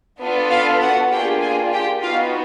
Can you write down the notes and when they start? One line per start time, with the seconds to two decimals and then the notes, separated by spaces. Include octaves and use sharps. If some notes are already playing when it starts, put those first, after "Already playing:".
0.20 B3 D4 F4 A4
0.51 F4 F5
0.82 F#4 F#5
1.12 A#3 D4 F4 G4 G#4 G5
1.42 G#4 G#5
1.73 G4 G5
2.03 B3 D#4 F4 F#4 F5